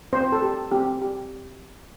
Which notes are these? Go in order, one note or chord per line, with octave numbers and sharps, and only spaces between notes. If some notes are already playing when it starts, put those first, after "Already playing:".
C4 C5
A4
G4
C4 G4
G4